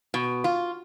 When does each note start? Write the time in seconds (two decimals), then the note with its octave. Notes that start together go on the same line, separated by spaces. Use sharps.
0.14 B2
0.44 F4